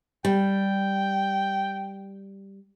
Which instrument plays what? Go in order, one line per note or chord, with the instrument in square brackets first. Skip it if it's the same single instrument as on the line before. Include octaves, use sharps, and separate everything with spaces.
[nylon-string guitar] G3 [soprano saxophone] G5